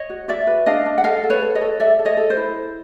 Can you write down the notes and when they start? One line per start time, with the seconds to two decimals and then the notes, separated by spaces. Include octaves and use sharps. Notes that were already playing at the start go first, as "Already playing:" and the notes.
Already playing: C#5 D#5
0.10 F#4
0.28 F#4 D5 E5
0.47 B4
0.66 D4 D#5 F5
0.86 D4
0.98 F#5
1.04 A4 D#5 F5
1.23 A4
1.30 B4 C#5
1.42 A4
1.55 C#5 D#5
1.61 A4
1.80 A4 D5 E5
1.99 A4
2.05 C#5 D#5
2.17 A4
2.30 C5
2.37 E4